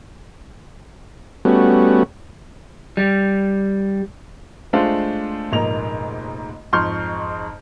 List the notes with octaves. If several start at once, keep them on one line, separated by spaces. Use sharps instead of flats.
G3 A3 B3 C#4 F#4
G3
G#3 A3 D4 F4 C5 F5
F1 A#1 G#2 A#3 D#4 F7
F2 G#2 C6 C#6 F6 G6